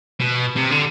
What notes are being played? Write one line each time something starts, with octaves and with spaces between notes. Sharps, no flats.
B2
C3
D3